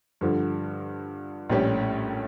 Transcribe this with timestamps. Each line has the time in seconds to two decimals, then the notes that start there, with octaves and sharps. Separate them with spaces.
0.21 G2 D3 F3
1.50 A#1 A2 G3 C#4 G4